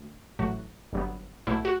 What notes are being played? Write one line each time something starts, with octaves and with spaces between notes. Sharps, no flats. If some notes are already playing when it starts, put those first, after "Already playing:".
Already playing: D2
A1 A2 F#3 A3 F#4
G1 G2 F#3 B3
B1 A2 F#3 A3 E4
F#4